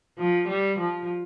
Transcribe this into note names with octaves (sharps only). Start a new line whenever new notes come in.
F3
G3
F3